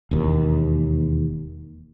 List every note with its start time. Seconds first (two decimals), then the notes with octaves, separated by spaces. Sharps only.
0.11 E1 D#2